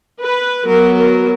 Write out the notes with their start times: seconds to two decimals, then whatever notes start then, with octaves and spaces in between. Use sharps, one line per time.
0.20 B4
0.65 F#3 B3 A#4
0.94 A#4